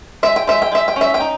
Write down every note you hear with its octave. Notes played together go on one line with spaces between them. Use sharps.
G#3 E5
G5
G#3 E5
G5
G#3 E5
G5
C#4 E5
G5
D#4